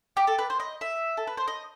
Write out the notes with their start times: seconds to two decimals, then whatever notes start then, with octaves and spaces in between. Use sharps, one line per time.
0.17 G4
0.27 A4
0.38 B4
0.50 C5
0.60 D#5
0.81 E5
1.17 A4
1.27 B4
1.37 C5
1.48 D#5